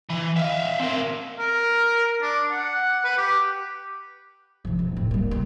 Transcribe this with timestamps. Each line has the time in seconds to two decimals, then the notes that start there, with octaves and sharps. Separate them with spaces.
0.09 E3
0.36 E5 F5
0.79 C4 A#4
1.38 A#4
2.22 D4
2.51 F#5
3.04 B4
3.17 G4
4.65 D3 F3
4.79 E1
4.96 A2 C4
5.11 G3 A#3
5.31 E1 C2